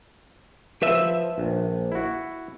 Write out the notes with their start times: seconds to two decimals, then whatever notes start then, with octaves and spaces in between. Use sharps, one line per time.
0.82 F3 B4 E5
1.38 A#1
1.92 E4 F#4